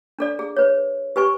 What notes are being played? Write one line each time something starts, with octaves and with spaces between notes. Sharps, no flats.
D4 A4 D5
G#4
B4 C#5
G4 B4 G#5 C#6